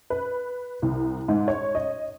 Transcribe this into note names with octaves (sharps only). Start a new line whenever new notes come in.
B4
C2
G#2
C#5
D#5